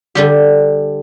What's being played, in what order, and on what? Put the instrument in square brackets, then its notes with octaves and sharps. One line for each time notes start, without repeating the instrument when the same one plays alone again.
[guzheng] D3 G3 G4